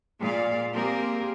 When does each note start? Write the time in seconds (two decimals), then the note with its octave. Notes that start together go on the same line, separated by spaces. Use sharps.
0.20 A#2 G#4 D5 F5
0.74 A#3 C4 G4 G#4 A#4